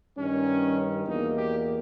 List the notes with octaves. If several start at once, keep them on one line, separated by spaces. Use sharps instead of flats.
G2 D#3 G3 C#4
E2 B2 A#3 D#4
G4